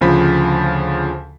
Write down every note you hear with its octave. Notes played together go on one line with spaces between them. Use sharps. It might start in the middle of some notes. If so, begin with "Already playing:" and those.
D2 C#3 F3 B5 B6